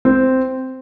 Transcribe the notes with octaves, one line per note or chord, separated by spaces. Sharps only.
C4